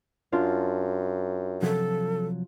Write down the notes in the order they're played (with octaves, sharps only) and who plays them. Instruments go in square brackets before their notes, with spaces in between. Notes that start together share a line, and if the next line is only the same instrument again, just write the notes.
[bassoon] F#2 [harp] D4 F4
[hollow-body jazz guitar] C3 F3 F#3 [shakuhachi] A4